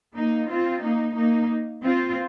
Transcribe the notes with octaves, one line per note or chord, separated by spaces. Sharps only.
A#3 D#4
C4 F4
A#3 D#4
A#3 D#4
C4 F4